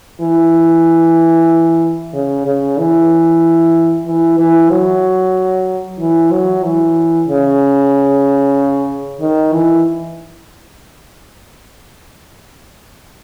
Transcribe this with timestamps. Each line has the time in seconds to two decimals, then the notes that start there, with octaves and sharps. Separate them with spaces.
0.21 E3
2.14 C#3
2.46 C#3
2.78 E3
4.06 E3
4.39 E3
4.70 F#3
6.00 E3
6.32 F#3
6.64 E3
7.28 C#3
9.21 D#3
9.53 E3